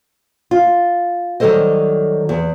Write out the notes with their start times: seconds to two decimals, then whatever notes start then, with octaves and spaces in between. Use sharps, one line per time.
0.51 F4
1.40 D#3 F#3 G3 A4 C5 D#5
2.29 E2